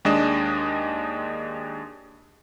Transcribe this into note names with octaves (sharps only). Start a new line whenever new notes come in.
D#2 G#3 D4 D#5 E7